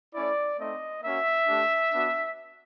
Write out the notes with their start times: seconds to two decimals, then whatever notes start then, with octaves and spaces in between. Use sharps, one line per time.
0.14 A3 C#4 E4 D5
0.59 A3 C4 D#4 D#5
1.03 A#3 C#4 F#4 E5
1.47 A3 D4 G4
1.92 B3 D4 F#4